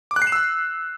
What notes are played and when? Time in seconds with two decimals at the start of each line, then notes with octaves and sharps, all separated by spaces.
0.11 D6
0.16 F#6
0.22 C7
0.27 E7
0.32 E6